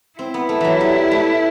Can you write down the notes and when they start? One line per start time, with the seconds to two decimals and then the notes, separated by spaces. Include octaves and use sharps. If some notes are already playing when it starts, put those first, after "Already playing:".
0.19 C4 E4
0.34 B3
0.49 A3
0.60 E3 F#3
0.81 G3
1.11 A3